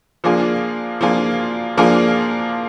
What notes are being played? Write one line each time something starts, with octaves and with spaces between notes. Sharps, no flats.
F3 A#3 D4 F4 G#4
F3 A#3 D4 F4 G#4
F3 A#3 D4 F4 G#4